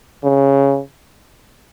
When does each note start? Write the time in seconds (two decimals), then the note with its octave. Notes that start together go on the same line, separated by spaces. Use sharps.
0.24 C#3